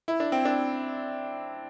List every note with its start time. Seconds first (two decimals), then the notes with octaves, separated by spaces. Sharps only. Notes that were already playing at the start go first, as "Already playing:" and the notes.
0.08 E4
0.20 D4
0.32 C4
0.45 D4